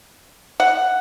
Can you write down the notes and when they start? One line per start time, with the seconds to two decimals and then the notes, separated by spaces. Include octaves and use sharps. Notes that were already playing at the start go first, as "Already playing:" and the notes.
0.60 F#5